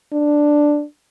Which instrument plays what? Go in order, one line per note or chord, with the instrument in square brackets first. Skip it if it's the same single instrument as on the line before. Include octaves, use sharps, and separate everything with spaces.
[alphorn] D4